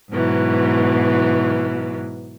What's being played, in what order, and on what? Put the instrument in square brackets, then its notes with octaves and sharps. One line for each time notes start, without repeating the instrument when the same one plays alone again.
[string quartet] G#2 B2 E3 F#3